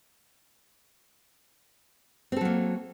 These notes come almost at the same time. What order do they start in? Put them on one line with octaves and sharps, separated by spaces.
C4 A4 F#3 A#3